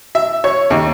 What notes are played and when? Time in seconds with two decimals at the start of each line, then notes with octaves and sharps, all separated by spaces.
0.15 E5
0.44 C#5
0.70 D#2